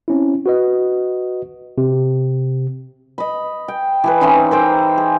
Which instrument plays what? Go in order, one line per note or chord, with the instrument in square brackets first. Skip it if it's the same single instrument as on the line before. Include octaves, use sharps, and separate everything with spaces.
[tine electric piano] C4 C#4 E4
F#4 B4 D#5
C3
[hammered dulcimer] D#5 B5
G5
E3 G#4 B4
E3 C4 C#4 D#4
A#4 C5 G5
G#4